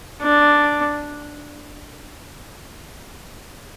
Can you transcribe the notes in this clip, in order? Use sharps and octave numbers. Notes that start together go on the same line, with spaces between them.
D4